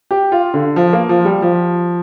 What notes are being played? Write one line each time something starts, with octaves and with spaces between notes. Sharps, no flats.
G4
F4
D3
F3
A#3
F3
G3
F3